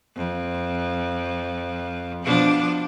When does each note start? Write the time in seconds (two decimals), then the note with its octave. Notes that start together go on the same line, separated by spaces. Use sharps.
0.16 F2
2.23 B2 F3 D4